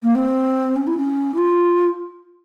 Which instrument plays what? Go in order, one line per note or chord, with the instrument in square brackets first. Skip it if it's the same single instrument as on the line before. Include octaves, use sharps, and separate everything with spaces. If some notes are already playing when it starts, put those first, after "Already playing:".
[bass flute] A#3
C4
C#4
E4
C#4
E4
F4